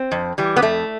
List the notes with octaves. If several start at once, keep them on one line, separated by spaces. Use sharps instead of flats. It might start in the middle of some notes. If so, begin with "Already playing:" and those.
Already playing: C4
F2
E3 G3
B3
F2 A3